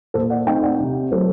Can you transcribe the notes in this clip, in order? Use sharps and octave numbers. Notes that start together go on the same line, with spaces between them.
A#2 A4 C5
D5 F#5
A3 C4 D#4 D#5 G5
D5 F#5
C3
F#3 A3 A4 C5